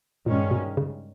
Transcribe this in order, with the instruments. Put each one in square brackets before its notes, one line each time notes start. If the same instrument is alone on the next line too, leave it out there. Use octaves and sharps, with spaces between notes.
[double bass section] G2 D#3 G#3 C#4 [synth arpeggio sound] A#2
[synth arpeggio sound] B2
C#3